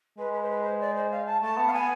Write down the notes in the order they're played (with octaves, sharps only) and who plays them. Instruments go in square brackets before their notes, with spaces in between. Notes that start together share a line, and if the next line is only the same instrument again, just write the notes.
[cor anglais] G#3 [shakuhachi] B4
[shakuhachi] B4
C5
B4
C5
D5
C5
F5
A5
[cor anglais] A3 [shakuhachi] A5
[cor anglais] B3
[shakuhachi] F5
[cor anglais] B3 [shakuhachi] G#5